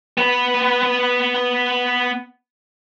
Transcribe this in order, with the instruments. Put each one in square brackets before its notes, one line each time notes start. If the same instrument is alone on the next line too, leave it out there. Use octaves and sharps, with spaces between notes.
[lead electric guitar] B3 B4